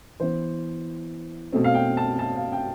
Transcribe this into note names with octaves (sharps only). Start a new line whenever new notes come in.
E3 B3 C5
B2 A3 C4
F5
G5
A5
A5
F5
G5